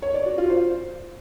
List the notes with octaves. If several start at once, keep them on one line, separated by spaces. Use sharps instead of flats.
C#5
D5
F#4
F4
C5